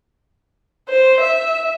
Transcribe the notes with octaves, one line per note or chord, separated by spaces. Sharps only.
C5
E5